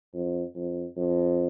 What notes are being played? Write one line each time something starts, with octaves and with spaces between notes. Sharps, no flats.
F2
F2
F2